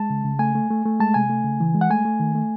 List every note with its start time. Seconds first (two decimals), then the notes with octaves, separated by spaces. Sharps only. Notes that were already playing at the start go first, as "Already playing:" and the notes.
Already playing: G#3 A5
0.10 C#3
0.25 C#3
0.39 A3 G#5
0.55 A3
0.70 A3
0.85 A3
1.00 G#3 A5
1.14 C3 G#5
1.29 A3
1.44 C#3
1.60 E3
1.74 G#3
1.81 F#5
1.90 A3 G#5
2.05 A3
2.20 D#3
2.35 A3